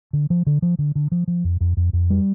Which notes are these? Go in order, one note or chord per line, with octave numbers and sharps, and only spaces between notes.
D3
F3
D3
F3
D3
D3
F3
F3
F2
F2
F2
F2
G3